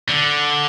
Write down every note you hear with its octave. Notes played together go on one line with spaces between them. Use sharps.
D3